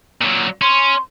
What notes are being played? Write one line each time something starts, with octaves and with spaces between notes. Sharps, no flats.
A#2 F#3
C#4 C6